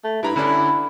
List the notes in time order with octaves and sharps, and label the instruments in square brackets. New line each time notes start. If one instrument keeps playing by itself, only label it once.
[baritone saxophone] A3
[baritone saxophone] G2 [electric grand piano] E4 A#5 B5
[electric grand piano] D3 C#4 D4 [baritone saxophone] E4